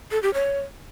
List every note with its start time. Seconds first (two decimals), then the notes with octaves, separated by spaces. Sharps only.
0.11 A4
0.23 G4
0.34 C#5